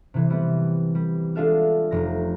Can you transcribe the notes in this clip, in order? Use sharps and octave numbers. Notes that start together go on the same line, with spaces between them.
C3 E3
G3 B3 C4
G3
G#3 D4 F4 A4 E5 F5
F1 A3 A#5 A#6